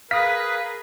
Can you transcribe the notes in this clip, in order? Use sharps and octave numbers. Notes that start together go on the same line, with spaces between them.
G#4 A#4 B4 F5 D#6 A#6 B6